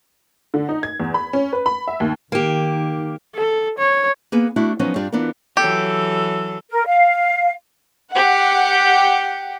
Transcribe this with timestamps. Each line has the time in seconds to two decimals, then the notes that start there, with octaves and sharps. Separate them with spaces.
0.54 D3
0.69 D#4
0.83 G#6
1.00 E2
1.14 B5
1.33 C#4
1.53 B4
1.66 B5
1.88 E5
2.00 D#2
2.32 D#3 A#3 G4
3.35 A4
3.78 C#5
4.32 A#3 B3 G#4 B4
4.56 A3 D4 E4 F#4
4.79 F3 F#3 B3 C#4 D#4
4.96 G2 G3 D4 F4
5.12 E3 B3 D4 F4 A#4
5.57 E3 F#3 G4 A4
6.71 A#4
6.86 F5
8.12 G4 F#5